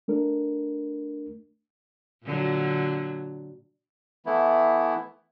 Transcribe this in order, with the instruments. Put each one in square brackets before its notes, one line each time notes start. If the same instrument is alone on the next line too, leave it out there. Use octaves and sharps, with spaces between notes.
[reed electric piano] A3 D4 A#4
[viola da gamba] A#2 D3 F#3
[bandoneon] E3 A3 B3 E4